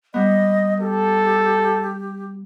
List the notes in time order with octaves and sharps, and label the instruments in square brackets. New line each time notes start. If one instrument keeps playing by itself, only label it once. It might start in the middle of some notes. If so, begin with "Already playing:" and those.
[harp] G3 B3 [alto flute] D#5
[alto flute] G4 [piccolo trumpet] A4